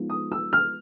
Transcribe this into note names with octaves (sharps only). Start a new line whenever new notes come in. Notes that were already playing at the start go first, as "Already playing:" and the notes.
Already playing: F3 G#3 B3 D#4
D#6
E6
F6